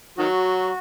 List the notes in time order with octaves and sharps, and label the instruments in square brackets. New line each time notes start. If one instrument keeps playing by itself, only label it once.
[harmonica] D#3 F#3 [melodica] F#4